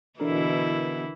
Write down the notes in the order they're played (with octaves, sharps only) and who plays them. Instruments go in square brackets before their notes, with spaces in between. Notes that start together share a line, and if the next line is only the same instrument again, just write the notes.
[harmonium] B2 [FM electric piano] D3 A#4 [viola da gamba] E3 E4